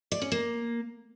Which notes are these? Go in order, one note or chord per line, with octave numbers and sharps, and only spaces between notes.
D5
C#4
A#3